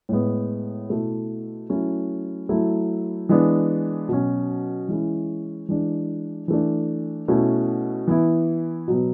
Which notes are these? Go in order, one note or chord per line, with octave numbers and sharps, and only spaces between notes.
A2 G#3 B3
B2 A3 E4
F#3 A3 C#4 E4
F#3 A3 E4
E3 G#3 B3 D4
B2 F#3 C#4
E3 G#3 C#4 E4
E3 G#3 D4
E3 A3 D4
B2 A3 C#4 E4
E3 B3 E4
B2 F#3 B3